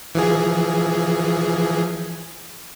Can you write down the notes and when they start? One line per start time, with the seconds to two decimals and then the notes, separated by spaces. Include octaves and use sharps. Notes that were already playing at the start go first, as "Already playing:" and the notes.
0.15 E3 F3 G#4